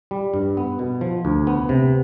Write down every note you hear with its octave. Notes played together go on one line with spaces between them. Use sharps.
G3
G2
B3
B2
F3
D2
B3
C3